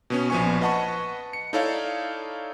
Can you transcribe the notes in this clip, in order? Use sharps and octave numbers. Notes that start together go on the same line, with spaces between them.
B2 B3 C#4
A#1 F3 B3 G#5 C#6
B4 D#5 F#5 A5 B5 C#6
C#7
D#4 E4 A4 C#5 D5 F5